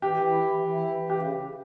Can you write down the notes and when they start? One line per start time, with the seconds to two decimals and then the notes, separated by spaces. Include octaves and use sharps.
0.02 E3 G4
0.17 E3
0.30 E4
0.45 E3
0.60 E3
0.73 E4
0.88 E3
1.02 E3
1.10 G4
1.15 C#3